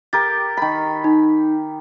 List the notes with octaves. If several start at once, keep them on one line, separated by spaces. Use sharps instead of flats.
G4 A#4 A6
D#3 B5
D#4